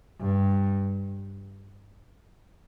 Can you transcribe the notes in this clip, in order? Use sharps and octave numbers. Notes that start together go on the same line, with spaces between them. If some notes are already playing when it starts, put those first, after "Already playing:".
G2